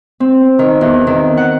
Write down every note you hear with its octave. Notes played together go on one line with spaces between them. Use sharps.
C4
D#3
E2
D#3
F#5